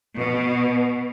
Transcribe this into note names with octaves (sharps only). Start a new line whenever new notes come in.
B2